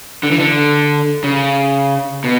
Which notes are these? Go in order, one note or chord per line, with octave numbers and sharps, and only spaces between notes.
D3
E3
D3
C#3
B2